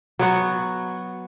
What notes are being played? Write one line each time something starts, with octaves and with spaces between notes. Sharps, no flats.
F#3 B3 F#4